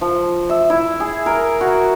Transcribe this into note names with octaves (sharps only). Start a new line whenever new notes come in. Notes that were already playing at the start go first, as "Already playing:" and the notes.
F3
E5
E4
G#4
A#4
F#4